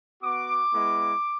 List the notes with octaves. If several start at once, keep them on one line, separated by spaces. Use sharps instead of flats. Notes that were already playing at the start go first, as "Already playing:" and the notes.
B3 F#4 D6
G#3 B3 E4